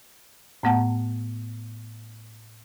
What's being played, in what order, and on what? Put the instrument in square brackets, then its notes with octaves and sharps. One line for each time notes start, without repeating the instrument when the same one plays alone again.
[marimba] A2 A3 B3 F#5 A5 A#5